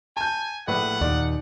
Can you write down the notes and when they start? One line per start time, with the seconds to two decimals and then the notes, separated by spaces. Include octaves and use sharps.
0.17 G#5 A5 G6
0.67 A#1 A2 B4 F#5
1.01 D#2 A#2 D#3 D5